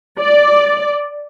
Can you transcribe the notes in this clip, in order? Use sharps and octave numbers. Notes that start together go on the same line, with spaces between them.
D5